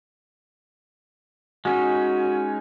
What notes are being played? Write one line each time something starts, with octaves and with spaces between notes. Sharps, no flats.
G#3 C#4 D#4 F#4